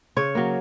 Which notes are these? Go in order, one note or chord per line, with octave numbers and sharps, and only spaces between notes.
C#3 C#5
F#3 A#3